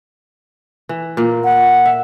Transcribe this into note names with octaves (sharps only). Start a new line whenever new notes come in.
E3
A#2 A#3
F#5
E5